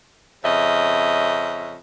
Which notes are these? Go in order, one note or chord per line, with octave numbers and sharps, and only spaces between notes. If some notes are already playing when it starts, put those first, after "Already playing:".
F2 C#3 C#4 D#5 E5